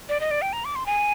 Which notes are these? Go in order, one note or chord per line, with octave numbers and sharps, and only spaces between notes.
D5
D#5
D5
G5
A#5
D6
C6
G#5